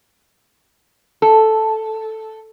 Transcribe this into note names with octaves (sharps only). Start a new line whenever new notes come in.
A4